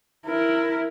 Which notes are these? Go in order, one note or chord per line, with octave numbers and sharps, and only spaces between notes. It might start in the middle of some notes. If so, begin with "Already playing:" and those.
E4 A#4